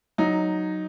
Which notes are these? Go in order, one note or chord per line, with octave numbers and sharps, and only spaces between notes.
F#3 D#4